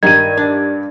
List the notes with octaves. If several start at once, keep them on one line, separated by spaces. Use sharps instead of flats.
G2 D#3 G3 G#6 D#7
D4